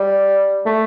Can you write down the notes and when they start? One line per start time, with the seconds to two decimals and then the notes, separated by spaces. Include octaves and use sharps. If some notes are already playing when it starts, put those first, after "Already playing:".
Already playing: G3
0.66 A3